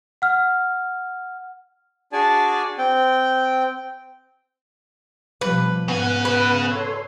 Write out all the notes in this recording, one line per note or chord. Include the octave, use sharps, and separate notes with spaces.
F#5 F6
D4 F#4 G#4 D5 G#5 A5
C4 G5
B2 F3 G3 B4
G#2 C#3 B3 F#5 G#5
B4
A4 C#5 C6